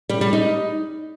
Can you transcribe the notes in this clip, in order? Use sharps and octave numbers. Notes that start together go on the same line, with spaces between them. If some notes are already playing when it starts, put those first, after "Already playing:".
G3
G3
D#4